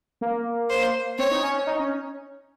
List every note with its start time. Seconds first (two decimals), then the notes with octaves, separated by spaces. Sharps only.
0.21 A#3
0.70 C5
1.18 C4 C#5
1.31 D#4
1.43 C#4
1.55 C#4
1.67 D#4
1.79 C#4